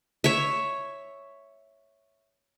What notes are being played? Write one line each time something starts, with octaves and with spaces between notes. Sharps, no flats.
C#5 E5